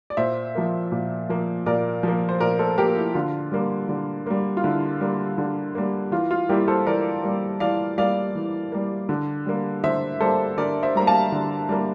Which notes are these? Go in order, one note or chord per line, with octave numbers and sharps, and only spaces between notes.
D5
A#2 C5 E5
F3 A#3
A#2
F3 A#3
A#2 A#4 D5
F3 A#3
C5
A#2 A#4 D5
A4 C5
F3 A#3 G4 A#4
E4
D3 F4
G3 A#3
D3
G3 A#3
F4
D3 E4
G3 A#3
D3
G3 A#3
E3 F4
F4
G3 A#3 E4 G4
A4 C5
E3 A#4 D5
G3 A#3
E3 D5 F5
G3 A#3 D5 F5
E3
G3 A#3
D3
G3 A#3
D3 C5 E5
G3 A#3 A4 C5
D3 A#4 D5
C5 E5
G3 A#3 A#5
F5 A5
D3
G3 A#3